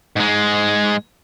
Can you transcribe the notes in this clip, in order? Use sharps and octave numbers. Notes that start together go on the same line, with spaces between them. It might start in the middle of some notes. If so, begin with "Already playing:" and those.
G#2 G#3